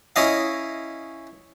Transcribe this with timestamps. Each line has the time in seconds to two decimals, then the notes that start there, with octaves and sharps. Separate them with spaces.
0.16 C#4 E4 D#5 F5